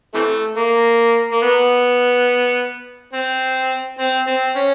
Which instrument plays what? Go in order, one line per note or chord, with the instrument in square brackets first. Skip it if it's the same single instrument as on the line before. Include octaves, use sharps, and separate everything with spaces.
[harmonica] C3 E3 A3
A#3
A#3
B3
C4
C4
C4
C#4